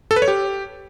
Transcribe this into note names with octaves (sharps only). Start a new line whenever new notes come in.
A4
B4
C#5
G4